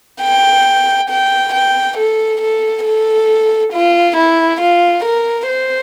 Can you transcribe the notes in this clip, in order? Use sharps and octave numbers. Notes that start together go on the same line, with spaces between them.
G5
G5
G5
A4
A4
A4
F4
E4
F4
A#4
C5